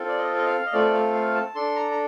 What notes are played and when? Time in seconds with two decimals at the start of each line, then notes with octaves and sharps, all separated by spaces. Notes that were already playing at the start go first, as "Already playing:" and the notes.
Already playing: C4 F4 A4
0.08 D5
0.18 D#5
0.37 D#5
0.46 F5
0.66 D#5
0.73 A3 C4 F4 A4 D5
0.94 F5
1.14 F5
1.35 A5
1.55 D4 A4 C6
1.76 A#5
1.91 A#5